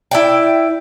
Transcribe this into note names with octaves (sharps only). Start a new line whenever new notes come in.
E4 D5 G5